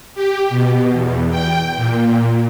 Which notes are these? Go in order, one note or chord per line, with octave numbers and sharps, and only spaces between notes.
G4
B2
E2
G5
A#2